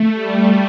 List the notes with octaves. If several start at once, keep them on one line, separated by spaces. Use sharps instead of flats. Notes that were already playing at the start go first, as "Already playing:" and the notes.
Already playing: A3
G3